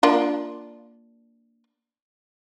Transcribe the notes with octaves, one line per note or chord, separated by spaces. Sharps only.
A#3 D4 F4